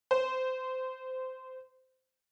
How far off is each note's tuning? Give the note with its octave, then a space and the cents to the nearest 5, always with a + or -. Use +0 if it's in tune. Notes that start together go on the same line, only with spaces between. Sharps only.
C5 -20